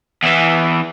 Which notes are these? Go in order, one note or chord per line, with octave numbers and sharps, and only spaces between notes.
E2 E3